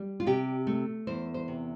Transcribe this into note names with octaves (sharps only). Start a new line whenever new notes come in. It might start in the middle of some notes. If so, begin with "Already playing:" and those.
Already playing: G3
F4
C3 G4
A3
E2 C5
C5
C3